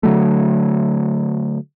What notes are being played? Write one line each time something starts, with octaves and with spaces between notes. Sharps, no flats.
D3 F#3 A3